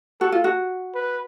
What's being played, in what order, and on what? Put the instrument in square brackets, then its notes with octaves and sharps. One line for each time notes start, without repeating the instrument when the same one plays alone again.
[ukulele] F#4 [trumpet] A4
[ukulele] F4
F#4
[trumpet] B4